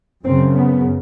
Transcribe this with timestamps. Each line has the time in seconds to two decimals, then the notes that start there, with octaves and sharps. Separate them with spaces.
0.24 F#2 C#3 C4
0.55 B3